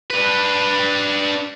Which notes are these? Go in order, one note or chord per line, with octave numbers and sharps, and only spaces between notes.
D4 B4